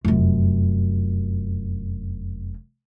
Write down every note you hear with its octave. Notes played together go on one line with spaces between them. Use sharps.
F1 F#2